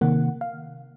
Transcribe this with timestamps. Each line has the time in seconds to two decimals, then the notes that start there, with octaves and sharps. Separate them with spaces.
0.01 C3 D#3 A#3 F#5
0.41 F5